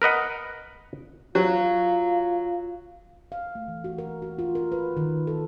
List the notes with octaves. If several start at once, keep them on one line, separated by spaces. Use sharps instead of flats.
A#4 B4 D#5 F#5
F#3 F4
F5
A3
E3
F#4
A#4
F#4
F4
A#4
B4
D#3
A4